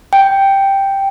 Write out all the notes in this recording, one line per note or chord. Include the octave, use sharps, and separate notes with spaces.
G5